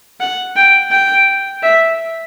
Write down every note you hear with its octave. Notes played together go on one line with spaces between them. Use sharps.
F#5
G5
G5
E5